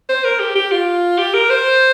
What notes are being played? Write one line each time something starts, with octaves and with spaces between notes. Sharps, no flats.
C5
A#4
G4
G4
F4
G4
A#4
C5